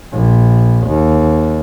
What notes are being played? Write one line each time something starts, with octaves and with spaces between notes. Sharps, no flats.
A#1
D#2